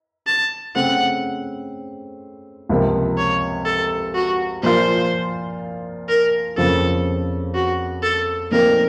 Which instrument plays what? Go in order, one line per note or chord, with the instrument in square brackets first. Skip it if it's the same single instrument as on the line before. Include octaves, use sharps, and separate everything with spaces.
[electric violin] A5
[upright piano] C#3 A3 C4 [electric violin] F#5
[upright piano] C#2 C3 F3 A#3
[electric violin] C#5
A4
F#4
[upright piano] A#2 F3 A#3 F4 [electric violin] C5
[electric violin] A#4
[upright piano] F2 C#3 F3 A#3 [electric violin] A4
[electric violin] F#4
A4
[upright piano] A#2 F3 A3 C4 D#4 [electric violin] A#4